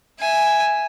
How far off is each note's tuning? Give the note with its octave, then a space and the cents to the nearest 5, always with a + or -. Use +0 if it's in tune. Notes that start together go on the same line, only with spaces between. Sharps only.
E5 +0 G#5 +0